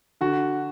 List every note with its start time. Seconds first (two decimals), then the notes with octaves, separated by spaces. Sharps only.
0.21 D3 F#4